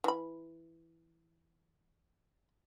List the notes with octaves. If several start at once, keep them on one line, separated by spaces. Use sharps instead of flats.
E3 B5